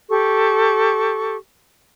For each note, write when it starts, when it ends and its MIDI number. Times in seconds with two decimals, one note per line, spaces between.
0.10 1.36 67
0.10 1.36 69
0.10 1.36 85